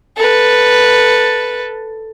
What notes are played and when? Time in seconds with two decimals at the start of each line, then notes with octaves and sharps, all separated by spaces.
0.17 A4 B4